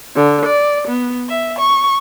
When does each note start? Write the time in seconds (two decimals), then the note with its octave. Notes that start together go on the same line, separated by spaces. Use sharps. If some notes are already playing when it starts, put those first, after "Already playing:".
0.16 D3
0.46 D5
0.89 B3
1.29 E5
1.59 C#6